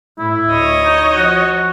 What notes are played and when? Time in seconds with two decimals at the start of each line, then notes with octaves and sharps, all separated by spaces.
0.18 A2 E4
0.50 D2 C#5 D#5
0.84 D#4
1.15 F3 F#4